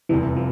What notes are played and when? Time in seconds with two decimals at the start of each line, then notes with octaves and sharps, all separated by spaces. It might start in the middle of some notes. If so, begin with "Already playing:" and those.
0.09 F1 E2 C3 E3 G3
0.37 F3